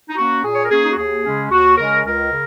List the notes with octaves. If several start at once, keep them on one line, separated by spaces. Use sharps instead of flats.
D#4
A#3 C#4 F#4
A#2 G#4
C#5
A#4
A#3 C#4 G#4
D#4
F#4
D#2 G#4
C#3 G#3 C#4
D#2 F#4
C#3 G#3 C#4 A#4
C#2 A#4
C#3